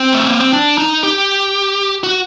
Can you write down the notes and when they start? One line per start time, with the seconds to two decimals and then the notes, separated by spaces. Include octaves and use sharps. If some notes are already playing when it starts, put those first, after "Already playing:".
Already playing: C4
0.14 A3
0.27 A#3
0.40 C4
0.53 D4
0.78 D#4
1.03 G4
2.04 F#4